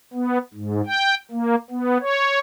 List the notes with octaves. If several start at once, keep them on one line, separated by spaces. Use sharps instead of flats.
B3
G#2
G5
A#3
B3
C#5